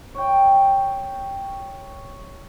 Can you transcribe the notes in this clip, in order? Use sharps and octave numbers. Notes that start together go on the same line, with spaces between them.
C#5 G5